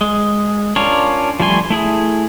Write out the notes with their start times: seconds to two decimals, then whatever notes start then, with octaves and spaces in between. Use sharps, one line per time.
0.01 G#3
0.76 C#4 D4 F4 A#4 C#5
1.40 F3 G3 A3 G#5 C6
1.70 A3 E4 G#4